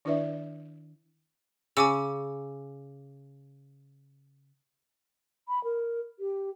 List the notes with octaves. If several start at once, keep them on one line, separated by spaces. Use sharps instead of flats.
D#3 D4 E4 B4 D5 E5
C#3 G#5 D6 E6
B5
A#4
G4